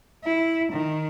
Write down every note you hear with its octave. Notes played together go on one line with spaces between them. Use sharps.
E4
D#3